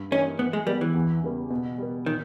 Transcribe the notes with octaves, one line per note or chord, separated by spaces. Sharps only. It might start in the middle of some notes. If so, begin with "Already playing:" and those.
Already playing: G2
E3 A#3 C#4 D#4 G4
E3 B3
G#3
G3 G#3 B3 G4
E3
E2
C#3 G3 B3
B2
G3 B3
A#2 D#3